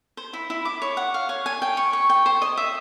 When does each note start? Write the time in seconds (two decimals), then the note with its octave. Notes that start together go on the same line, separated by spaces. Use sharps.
0.17 C5
0.33 E4
0.50 E4
0.65 D6
0.82 C#5
0.97 F#5
1.14 F5
1.29 C#5
1.46 G#5
1.62 G5
1.77 C#6
1.93 C#6
2.10 G5
2.26 C5
2.42 D#5
2.57 E5